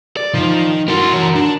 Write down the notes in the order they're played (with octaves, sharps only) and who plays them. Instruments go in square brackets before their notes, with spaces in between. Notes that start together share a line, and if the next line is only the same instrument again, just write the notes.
[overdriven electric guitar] D5
[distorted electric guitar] D#3 [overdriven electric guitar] F3
[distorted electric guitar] E4 C6 [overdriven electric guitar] F#4 A#4
[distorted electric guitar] E3 C#5
D4